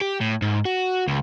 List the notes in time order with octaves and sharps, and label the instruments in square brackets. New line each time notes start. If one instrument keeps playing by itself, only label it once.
[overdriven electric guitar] G4
A2
G#2
F#4
C#2